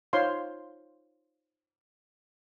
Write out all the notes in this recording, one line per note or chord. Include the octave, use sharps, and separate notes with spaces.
D#4 F4 C5 C#5 F5 C6